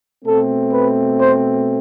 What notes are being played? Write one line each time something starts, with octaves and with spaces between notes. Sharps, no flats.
B2 A3 C4 A4
B4
C5